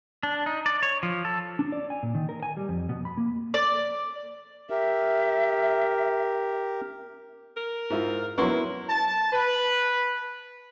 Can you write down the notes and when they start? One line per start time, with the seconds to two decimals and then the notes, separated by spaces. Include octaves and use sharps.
0.23 D4
0.46 D#4
0.66 D5
0.83 C#5
1.03 F3
1.25 A4
1.59 D4
1.72 D5
1.90 G#5
2.03 A#2
2.15 D#3
2.29 A#4
2.43 G#5
2.57 G3
2.69 F2
2.89 B2
3.05 B5
3.18 A#3
3.54 D5
4.70 G4 A#4 E5
7.57 A#4
7.90 G#2 E4 F4
8.38 F#3 B3 E4 A#4 C6 C#6
8.88 A5
9.32 B4